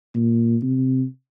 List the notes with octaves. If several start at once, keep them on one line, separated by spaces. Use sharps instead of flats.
A#2
C3